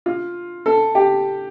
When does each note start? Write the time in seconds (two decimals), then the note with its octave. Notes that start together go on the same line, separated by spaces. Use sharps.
0.06 F4
0.66 A4
0.95 G4